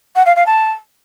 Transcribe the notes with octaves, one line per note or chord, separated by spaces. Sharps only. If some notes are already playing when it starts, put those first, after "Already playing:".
F#5
F5
F5
A5